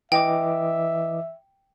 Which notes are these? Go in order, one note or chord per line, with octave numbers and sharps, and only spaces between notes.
E3 D#5 E5 G5 D6